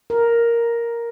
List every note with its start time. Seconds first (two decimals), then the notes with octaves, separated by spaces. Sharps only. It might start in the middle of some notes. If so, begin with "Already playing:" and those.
0.10 A#4